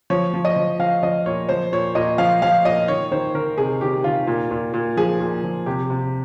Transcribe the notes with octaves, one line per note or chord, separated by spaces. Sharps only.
F3 C#5
F3
D#5
F3
F3 F5
F3 D#5
A#2 C#5
F3 C5
A#2 C#5
A#2 D#5
F3 F5
F3 F5
A#2 D#5
D#3 C#5
D#3 C5
D#3 A#4
C3 G#4
D#3 G4
D#3 F4
A#2
A#2
A#2
F3 G#4
A#2
F3
C3 G4
C3